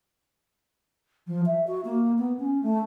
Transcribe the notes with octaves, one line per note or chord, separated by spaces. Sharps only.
F3
E5
F#4
A#3
B3
C#4
A3